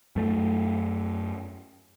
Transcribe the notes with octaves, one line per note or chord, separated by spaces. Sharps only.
F#2 A3